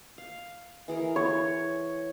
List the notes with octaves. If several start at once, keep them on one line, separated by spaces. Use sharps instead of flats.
F5
E3 G#4 A#4
C#5